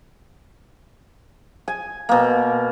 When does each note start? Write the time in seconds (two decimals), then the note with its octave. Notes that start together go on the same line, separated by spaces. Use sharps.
1.68 G#5
2.09 B2 A#3